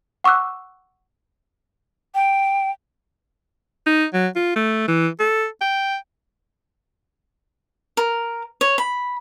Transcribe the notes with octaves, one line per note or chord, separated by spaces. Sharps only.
F#5 C#6 D6 E6 F#6
G5
D#4
F#3
F4
A3
E3
A4
G5
A#4
C#5
B5